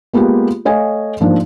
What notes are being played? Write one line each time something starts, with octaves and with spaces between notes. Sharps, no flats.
G#3 A#3 B3 F4 G4
A3 C#5 D#5 F5 G#5
G#2 F3 A#3 D4